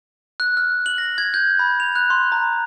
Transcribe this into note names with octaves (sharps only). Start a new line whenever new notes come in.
F#6
F6
F#7
A#6
G#6
G6
B5
F7
F#6
C6
A#5